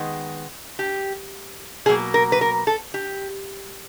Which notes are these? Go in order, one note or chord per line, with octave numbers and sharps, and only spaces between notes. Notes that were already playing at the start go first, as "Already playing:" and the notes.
Already playing: D#3 G#3 B3
G4
B2 F#3 A#3 G#4
A#4
B4
A#4
A4
G4